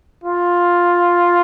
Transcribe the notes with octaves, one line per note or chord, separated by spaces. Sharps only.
F4